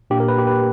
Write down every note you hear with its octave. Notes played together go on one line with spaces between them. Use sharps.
A#2 A#3 D4 G4
A#4
B4
G4
B4